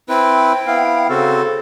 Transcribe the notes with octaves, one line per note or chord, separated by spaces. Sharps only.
C4 E4 B4 G5
B3 E4 F5
C#3 C4 F#4 A4